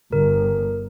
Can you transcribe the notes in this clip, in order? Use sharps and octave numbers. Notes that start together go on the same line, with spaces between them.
G1 A#4